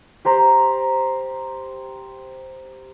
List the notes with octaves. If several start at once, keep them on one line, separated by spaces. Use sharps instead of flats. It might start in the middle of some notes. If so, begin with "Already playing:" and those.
G4 C5 A#5